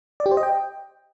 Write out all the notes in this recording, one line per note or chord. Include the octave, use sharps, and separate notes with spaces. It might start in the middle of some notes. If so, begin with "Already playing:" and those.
D5
G4
C5
D#5
G5